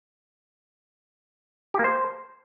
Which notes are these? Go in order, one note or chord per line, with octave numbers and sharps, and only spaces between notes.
G4
A#3
C5